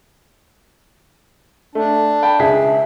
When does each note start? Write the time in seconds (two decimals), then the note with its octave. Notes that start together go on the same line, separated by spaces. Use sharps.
1.75 A3 D4
2.23 G5 A5 B5
2.39 C#2 G#4 E5 B6